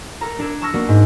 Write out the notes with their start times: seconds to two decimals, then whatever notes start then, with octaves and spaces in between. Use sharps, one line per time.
0.21 A4 A#4 A#5
0.39 D4 A4 G#6
0.62 A5 C#6 E6 F6 A#6
0.74 A#3 B3 F#4 A#4 D5
0.88 G#2